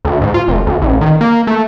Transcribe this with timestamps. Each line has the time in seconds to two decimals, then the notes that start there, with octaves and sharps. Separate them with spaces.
0.05 D2
0.22 G#2
0.34 F4
0.48 F1
0.67 D2
0.82 A1
1.01 D#3
1.21 A#3
1.47 A3